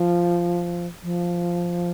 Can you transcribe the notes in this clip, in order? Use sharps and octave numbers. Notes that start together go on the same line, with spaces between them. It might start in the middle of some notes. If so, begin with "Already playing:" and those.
Already playing: F3
F3